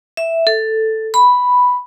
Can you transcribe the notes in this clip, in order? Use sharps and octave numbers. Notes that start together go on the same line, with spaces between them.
E5
A4
B5